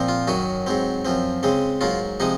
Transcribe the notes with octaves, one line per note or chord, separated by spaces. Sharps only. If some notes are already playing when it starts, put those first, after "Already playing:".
Already playing: A#2 F3 C4
F4
F#2 D#3 F#3 F#4
G#2 F#3 C4
F#2 F3 C4
C#3 G#3 C4
G#2 F#3 A#3 F4
C3 F3 G#3 D#4